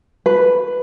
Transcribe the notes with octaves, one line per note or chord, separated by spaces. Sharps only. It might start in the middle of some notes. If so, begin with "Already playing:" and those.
B4